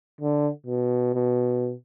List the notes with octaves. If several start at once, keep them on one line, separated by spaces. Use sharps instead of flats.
D3
B2
B2